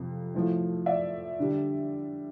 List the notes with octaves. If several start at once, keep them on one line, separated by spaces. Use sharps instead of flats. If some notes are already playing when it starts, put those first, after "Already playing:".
Already playing: F2 C3
A2 F3 A3
D5 E5
D3 G3